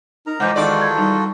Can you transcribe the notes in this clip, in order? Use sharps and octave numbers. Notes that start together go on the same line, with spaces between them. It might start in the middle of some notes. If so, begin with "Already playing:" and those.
D#4 A#4 A#5
C3 E3 F3 G#3 F#5 D6 G6
E2 D#3 F4 F#4 A4 D5
A5 G#6
G3 D#4